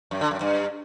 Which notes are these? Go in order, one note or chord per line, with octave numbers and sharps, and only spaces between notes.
F#2
D3
F#2
G2